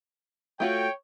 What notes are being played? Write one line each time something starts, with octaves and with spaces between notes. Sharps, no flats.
A3 F4 F#4 C#5 G5